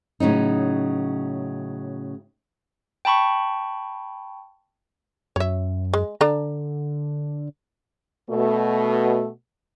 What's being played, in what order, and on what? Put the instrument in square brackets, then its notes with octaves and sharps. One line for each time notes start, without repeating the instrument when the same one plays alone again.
[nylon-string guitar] A2 C#3 F#3 D#4
[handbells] G5 A5 B5 C#6
[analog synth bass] F#2 [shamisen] C#5 E5
[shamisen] G#3
[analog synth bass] D3 [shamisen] D4 A4 A#5
[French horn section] B2 A3